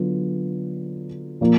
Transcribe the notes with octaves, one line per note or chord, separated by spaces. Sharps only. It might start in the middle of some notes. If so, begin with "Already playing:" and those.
Already playing: D3 F#3 B3 F4
A#2 F3 A#3